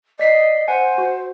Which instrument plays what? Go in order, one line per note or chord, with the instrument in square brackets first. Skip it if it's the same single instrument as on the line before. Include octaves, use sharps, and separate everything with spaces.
[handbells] D5 B6 C7 [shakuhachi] D#5
[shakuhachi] C5 [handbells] F#5 G#5
[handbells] F#4